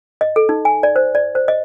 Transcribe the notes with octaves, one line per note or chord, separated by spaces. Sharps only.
D#5
A4
D#4
G#5
D5
C5
D5
C5
D#5